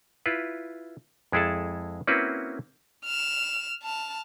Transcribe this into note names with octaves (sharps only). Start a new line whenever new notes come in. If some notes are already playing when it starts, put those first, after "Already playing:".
E4 F4 B4
F2 G#3 E4 G#4 A4 A5
A#3 C4 C#4 E4 F#4 B4
F6 E7
A5 F6